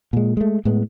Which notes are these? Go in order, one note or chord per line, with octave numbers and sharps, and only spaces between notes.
A#2 G#3
G#3 A3
A2 G#3 B3